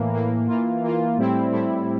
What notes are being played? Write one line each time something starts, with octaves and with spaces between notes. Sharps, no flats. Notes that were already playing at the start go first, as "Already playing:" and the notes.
Already playing: A2 E3 A#3
A2 E3 A#3
E3 A#3 F4
E3 A#3 F4
A2 G3 C4 E4
A2 G3 C4 E4